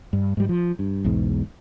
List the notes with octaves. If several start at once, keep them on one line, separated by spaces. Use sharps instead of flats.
G2
G#2 G3
F3
G2
B1 E2 G#2